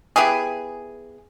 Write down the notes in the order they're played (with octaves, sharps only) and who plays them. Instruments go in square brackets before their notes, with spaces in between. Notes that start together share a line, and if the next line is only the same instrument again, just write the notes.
[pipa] B3 E4 G4 G#4